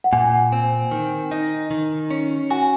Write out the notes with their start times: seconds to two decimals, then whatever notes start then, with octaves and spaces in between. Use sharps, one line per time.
0.04 F#5
0.13 A#2 G#5
0.52 C4
0.91 D#3
1.31 D#4
1.71 D#3
2.11 C#4
2.51 F#4 G#5